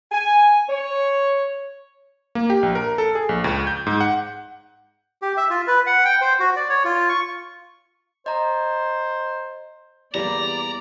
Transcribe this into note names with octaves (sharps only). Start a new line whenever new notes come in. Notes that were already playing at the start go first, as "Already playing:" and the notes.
G#5
C#5
A#3
G4
A#1
A#4
A4
G#4
A#1
C#2
G6
G#2
F#5
G4
E5
F4
B4
F#5
G5
C5
F#4
D5
C#5
F4
C#6
C5 D#5 A#5
E2 G3 A#3 D5 A#5